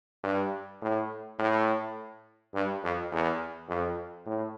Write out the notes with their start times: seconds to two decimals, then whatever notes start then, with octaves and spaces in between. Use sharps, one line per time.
0.23 G2
0.82 A2
1.39 A2
2.54 G2
2.83 F2
3.11 E2
3.68 F2
4.26 A2